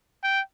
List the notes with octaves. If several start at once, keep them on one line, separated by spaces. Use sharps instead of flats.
G5